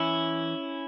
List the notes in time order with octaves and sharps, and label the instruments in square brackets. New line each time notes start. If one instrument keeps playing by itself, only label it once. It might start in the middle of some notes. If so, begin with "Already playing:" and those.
Already playing: [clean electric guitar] E3 C#4 E4